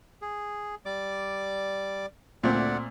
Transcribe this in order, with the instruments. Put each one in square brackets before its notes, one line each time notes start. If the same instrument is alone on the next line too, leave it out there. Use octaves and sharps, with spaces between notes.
[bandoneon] G#4
G3 D5 D6
[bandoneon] D2 D5 F#5 [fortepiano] A#2 A3 C4